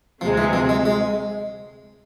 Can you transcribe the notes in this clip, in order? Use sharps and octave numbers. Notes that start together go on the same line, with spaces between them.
D2 C3 F3 G#3 C4
E3
F3
G#3
G#3